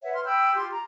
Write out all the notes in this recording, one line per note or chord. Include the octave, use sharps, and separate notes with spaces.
B4 C#5 E5 F#5
C6 F6
G5 B5 E6 G6
F4 G4 C6
A#5